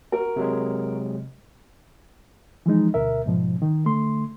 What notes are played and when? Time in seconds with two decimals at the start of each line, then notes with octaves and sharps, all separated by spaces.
0.12 F#4 A#4
0.36 C3 F#3 G#3
2.66 E3 F3 G#3 D#4
2.94 D2 B2 A#4 E5
3.26 G#2 B2 F3
3.62 D#3
3.85 D3 A3 C6